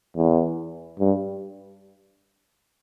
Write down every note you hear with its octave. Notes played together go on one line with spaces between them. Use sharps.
E2
G2